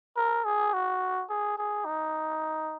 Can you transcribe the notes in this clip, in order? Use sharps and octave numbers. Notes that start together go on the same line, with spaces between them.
A#4
G#4
F#4
G#4
G#4
D#4